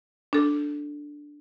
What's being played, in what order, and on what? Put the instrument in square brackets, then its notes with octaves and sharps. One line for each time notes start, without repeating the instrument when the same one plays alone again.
[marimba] D4 A4